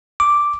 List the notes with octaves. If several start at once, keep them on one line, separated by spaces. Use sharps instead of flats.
D6